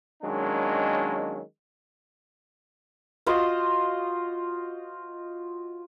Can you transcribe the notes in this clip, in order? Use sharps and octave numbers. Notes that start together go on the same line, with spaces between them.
D#3 F#3 G#3 A#3 C#4 D4
F4 F#4 C5 D#5